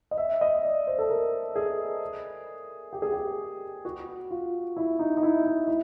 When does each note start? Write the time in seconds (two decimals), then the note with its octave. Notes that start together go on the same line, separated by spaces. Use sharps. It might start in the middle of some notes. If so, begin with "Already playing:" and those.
0.11 D#5
0.17 E5
0.41 D#5
0.63 D5
0.87 C5
0.99 A4
1.10 A#4
1.56 G#4
2.93 G4
3.02 G#4
3.12 G4
3.85 F#4
4.31 F4
4.77 E4
4.99 D#4
5.17 D#4
5.23 E4
5.46 D#4
5.67 E4